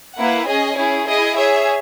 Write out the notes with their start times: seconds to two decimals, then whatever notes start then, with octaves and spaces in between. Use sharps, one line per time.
0.16 A#3 E4 B4 F#5
0.47 C#4 G#4 D#5 G#5
0.77 C#4 E4 G#4
1.08 E4 G#4 D#5 G#5
1.38 G#4 C#5 E5